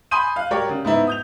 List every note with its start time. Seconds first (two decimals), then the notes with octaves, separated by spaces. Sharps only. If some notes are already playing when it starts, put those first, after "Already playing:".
0.11 G#5 B5 C6 D#6 G6 D#7
0.36 F5 F#6
0.51 G3 F#4 G4 A#4 C#5 D5
0.69 C#3
0.85 G#2 B3 E4
1.07 D#6 G6 F7